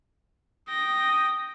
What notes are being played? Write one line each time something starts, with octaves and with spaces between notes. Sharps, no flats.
G5 D#6 A#6